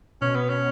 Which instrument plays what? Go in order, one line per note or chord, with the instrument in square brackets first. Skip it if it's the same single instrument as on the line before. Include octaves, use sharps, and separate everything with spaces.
[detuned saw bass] B2 [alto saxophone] C#4
[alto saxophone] B3
C#4